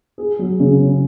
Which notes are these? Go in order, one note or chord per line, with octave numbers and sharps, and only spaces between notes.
G#4
F#3
C#3
C#4